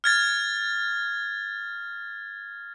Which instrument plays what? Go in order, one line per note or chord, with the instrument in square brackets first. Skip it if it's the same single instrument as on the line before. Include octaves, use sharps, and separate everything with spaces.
[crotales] F6 G#6 A6